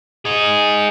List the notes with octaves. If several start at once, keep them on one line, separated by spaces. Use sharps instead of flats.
D#4 G#4